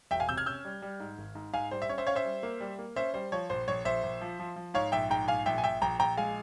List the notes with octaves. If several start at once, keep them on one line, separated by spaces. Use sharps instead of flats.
E1 E5 G5
F5 G#5
C3 E6 G6
F6 G#6
C#4 E6 G6
G3
G3
G#2
G#1
G#2
G#2 F5 G#5
G3 C5
E5
C#4 C#5
C5 E5
C#4 C#5 F5
C5 E5
G3
A#3
G3
A#3
C#4 C5 E5
G3 C5
F3 C#5
A#1 C5
A#1 C#5
A#1 C5 E5
A#1
F3
F3
F3
G#2 C#5 F5
A#1 E5 G5
G#2 G5 A#5
A#1 F5 G#5
A#1 E5 G5
G#5
A#1 E5 G5
A#1 G5 A#5
A#1 G5 A#5
G#3 F5 G#5